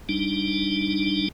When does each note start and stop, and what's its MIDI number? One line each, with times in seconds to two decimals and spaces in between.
0.09 1.28 55
0.09 1.28 62
0.09 1.28 63